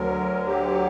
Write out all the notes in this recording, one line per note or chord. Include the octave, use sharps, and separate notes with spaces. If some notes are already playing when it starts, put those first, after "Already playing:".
Already playing: D2 D3 F#3 A#4
G4